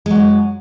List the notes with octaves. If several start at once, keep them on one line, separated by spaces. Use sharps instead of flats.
F#2 F#3 G#3